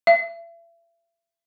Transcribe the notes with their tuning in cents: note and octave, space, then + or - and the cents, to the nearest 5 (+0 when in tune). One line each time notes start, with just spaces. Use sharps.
E5 +40